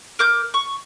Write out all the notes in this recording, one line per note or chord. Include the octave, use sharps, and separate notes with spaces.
A#4 D6 G6
C#6